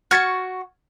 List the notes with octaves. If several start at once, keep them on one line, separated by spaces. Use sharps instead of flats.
F#4 C#6 F6 G#6 A6